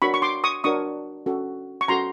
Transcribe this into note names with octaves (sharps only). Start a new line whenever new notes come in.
D4 F#4 A#4 C#5 B5 C#6
C#6
C6 D6
C#6 D#6
D4 F#4 A#4 C#5 C#6 D#6
C#4 F#4 A4
C#6
C#4 F#4 A4 A#5 C6